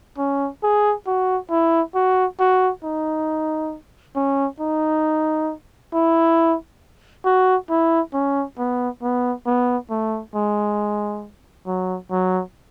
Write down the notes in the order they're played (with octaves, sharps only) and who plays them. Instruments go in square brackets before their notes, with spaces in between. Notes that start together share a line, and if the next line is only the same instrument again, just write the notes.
[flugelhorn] C#4
G#4
F#4
E4
F#4
F#4
D#4
C#4
D#4
E4
F#4
E4
C#4
B3
B3
B3
A3
G#3
F#3
F#3